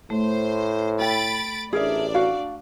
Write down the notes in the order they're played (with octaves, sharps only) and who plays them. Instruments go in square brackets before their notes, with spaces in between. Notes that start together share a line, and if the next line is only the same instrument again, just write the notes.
[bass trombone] A2 [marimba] A3 [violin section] C5
[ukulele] A4 G5 [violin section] B5 A6 D7
[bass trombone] A1 [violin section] D4 D5 [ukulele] G#4 A#4 E5
[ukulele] F#4 F5